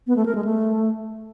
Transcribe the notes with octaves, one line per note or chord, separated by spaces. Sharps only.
B3
A3
A#4
G#3
A3